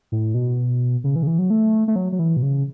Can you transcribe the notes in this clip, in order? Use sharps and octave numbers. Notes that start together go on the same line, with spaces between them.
A2
B2
C#3
E3
C#3
E3
F#3
A3
A3
F#3
F#3
E3
B2
C#3